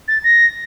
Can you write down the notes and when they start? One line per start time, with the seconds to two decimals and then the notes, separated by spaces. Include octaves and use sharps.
0.08 A6
0.24 A#6